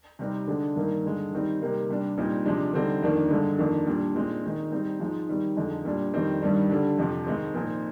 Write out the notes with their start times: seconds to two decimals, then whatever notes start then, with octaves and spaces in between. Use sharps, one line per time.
0.19 C3 G3 C4 D#4
0.47 D3 G#3 D4
0.76 G2 D#3 A#3 D#4
1.04 G2 D3 G#3
1.32 D#3 G3 C4 D#4
1.61 C3 G3 A#3 D#4
1.89 C3 G3 D4
2.17 A#2 G3 C4 D#4
2.46 C3 F3 G#3 D4
2.73 D3 G3 C4 D#4
3.02 F2 D#3 A#3 D4
3.30 G2 D3 G#3
3.58 F2 D#3 A#3 D4
3.86 A#2 G3 D4
4.15 A#2 G#3 C4 D#4
4.44 D#3 G#3 D#4
4.71 G#2 G3 C4 D#4
5.00 G#2 F3 G#3 D#4
5.28 D#3 G3 C4 D#4
5.56 F2 D3 G#3 D#4
5.85 A#2 G3 D4
6.13 F2 D#3 G3 C4 D#4
6.42 G2 D#3 G3 D4
6.70 D3 G3 D4
6.98 F2 C3 F3
7.26 G#2 D#3 G#3 C4
7.54 A#2 F3 C4 D#4